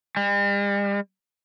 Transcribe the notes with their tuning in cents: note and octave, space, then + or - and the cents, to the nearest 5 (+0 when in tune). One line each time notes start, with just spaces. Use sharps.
G3 +45